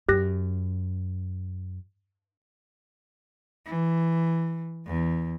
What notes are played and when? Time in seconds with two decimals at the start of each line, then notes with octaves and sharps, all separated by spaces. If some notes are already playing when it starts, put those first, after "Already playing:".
0.09 F#2 G4 F#6 A#6
3.66 E3
4.86 E2